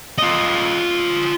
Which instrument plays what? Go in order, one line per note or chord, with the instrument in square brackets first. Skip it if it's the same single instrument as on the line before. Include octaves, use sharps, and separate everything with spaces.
[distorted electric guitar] F4 D#5